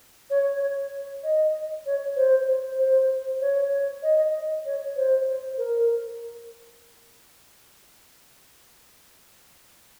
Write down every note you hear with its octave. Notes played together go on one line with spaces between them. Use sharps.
C#5
D#5
C#5
C5
C5
C#5
D#5
C#5
C5
A#4